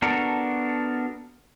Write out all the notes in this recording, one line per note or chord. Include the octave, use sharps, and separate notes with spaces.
B3 D4 F#4 A4 A#4